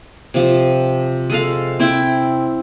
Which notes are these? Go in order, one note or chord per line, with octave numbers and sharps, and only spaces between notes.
C3 F3
G#3 A4 F5
C4 E4 G5